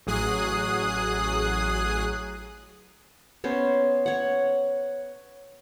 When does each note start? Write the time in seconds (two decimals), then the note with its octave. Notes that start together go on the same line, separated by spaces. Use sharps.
0.07 A1 F#3 G#4 D#6 F#6 C7
3.44 B3 C#4 C5
4.06 C#5 F#5